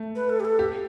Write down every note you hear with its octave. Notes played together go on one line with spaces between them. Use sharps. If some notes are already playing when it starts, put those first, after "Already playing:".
Already playing: A3
B4
A4
G4
A4
G4